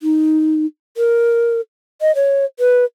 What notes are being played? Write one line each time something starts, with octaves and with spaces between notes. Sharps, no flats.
D#4
A#4
D#5
C#5
B4